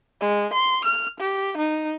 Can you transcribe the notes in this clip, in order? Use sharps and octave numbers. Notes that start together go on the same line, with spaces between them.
G#3
C6
F6
G4
D#4